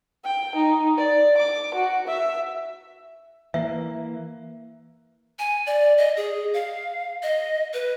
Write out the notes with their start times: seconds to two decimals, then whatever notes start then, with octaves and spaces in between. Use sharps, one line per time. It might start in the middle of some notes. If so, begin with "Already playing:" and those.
0.25 G5
0.56 D#4
0.97 D5
1.37 D6
1.75 F#4
2.07 E5
3.54 E3 A#3 E5
5.39 G#5
5.67 D5
5.98 D#5
6.17 G#4
6.54 F5
7.23 D#5
7.74 B4